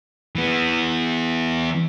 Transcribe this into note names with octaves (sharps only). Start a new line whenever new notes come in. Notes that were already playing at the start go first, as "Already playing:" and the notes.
E3 B3